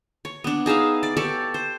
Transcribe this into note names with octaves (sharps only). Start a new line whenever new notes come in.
C#5
B3 D4
D#4 G#4 E5 F5
D5
G4 A4 C#5 D5
C5